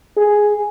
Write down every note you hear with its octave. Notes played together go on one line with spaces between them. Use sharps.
G#4